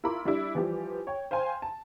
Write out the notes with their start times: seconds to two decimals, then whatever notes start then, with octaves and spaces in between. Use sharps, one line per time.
0.04 E4 F4 A#4 B5 C6 D6
0.25 G3 D4 E4
0.55 E3 F3 G3 G4
1.07 C#5 G5
1.31 C5 F5 G5 G#5 C6
1.62 A5